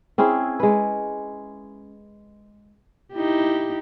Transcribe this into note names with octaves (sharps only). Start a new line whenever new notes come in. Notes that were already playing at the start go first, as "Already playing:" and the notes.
C4 C#4 E4 G#4
G#3 B4
D#4 E4 G4